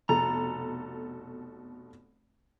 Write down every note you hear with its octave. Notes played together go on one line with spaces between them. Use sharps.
F1 B2 A4 A#5